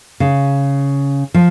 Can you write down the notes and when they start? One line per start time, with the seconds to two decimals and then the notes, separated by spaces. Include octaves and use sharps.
0.20 C#3
1.34 F3